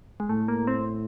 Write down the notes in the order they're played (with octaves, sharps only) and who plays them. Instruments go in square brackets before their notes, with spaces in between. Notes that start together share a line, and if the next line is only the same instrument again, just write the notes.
[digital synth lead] G#3
[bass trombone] A2 [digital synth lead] A3
[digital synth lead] A#3
C4